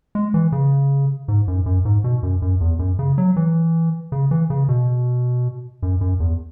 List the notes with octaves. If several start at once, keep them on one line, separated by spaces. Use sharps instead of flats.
G#3
E3
C#3
G#2
F#2
F#2
G#2
B2
F#2
F#2
E2
F#2
C#3
F#3
E3
C#3
E3
C#3
B2
F#2
F#2
E2